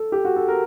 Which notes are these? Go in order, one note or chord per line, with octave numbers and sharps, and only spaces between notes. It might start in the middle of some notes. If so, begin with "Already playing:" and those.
Already playing: A4
G4
F#4
A4
A#4